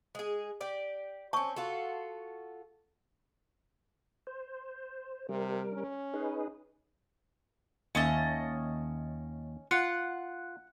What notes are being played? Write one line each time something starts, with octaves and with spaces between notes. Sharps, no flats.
G#3 G#4
G4 D5
C4 C#4 A5 C#6
F4 F#4 A4
C5
C3 G3 A#4
C#4
D#4 G#4 B4
D#2 C#4 D#5 E5 A5
F4 F#5